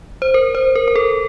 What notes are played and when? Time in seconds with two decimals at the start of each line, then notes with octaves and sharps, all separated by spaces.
0.22 C5
0.34 A#4
0.55 C5
0.75 A#4
0.88 A#4
0.96 A4